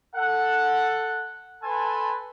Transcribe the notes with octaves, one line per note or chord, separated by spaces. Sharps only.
A4 F#5
A4 B4 G#5 A5 C6